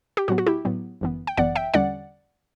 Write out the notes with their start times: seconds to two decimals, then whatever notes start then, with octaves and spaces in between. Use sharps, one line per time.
0.17 G4
0.28 A2 F#3 B3 F#4
0.38 F#4
0.47 E4 G4
0.65 A2 F#3 B3
1.01 G1 F#2 E3 B3
1.27 G5
1.37 G1 F#2 E3 B3 D5 F#5
1.55 E5 G5
1.74 E2 D3 G3 C#4 D5 F#5